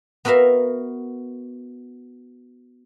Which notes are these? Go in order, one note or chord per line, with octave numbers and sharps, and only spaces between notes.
B3 F#4 A#4 E5 F5